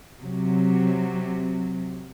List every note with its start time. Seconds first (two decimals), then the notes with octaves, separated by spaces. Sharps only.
0.21 C3 F#3